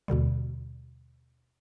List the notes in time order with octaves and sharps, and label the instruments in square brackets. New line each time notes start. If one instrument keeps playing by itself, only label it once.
[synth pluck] D#2 B2 D3 G3